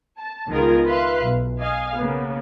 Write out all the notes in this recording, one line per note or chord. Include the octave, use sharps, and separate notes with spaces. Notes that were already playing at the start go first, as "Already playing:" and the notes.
A5
C#2 D#3 B3 F4 G#4 A#4
B4 E5 F5 C6 F#6
B1
D#5 F5 G#5
C#3 A#3 B3